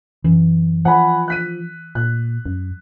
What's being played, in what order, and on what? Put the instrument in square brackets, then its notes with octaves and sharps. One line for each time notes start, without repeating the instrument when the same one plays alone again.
[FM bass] F#2 [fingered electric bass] E3
[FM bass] F3 [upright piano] F#5 G#5 B5
[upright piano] F#6 B6 D#7
[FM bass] A#2 [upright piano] F#6
[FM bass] F#2